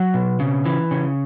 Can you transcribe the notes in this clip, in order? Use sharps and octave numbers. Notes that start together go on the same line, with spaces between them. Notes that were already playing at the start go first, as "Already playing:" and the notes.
Already playing: F#3
B2
C#3
E3
C#3